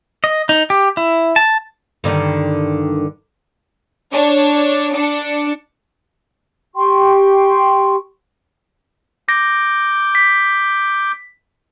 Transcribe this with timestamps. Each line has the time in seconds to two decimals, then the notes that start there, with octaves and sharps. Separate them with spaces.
0.24 D#5
0.49 D#4
0.70 G4
0.97 E4
1.36 A5
2.04 G2 D3 D#3
4.11 D4 C#5
4.96 D4 C#7
6.75 G4 G5 C6 C#6
9.29 D6 G6 A#6
10.15 B6